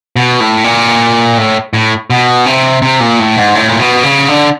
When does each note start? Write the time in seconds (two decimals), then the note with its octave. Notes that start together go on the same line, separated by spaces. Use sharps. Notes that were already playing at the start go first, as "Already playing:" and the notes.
0.16 B2
0.40 A2
0.64 A#2
1.38 A2
1.74 A2
2.10 B2
2.46 C3
2.82 C3
3.00 A#2
3.20 A2
3.37 G#2
3.55 A2
3.68 A#2
3.79 B2
4.03 C#3
4.28 D3